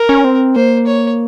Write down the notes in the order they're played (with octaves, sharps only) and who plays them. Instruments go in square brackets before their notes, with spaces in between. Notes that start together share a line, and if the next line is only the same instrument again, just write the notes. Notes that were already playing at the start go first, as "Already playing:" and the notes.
Already playing: [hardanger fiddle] A#4
[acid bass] C#4
C4
[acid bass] A#3 [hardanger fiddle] C5
[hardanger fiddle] C#5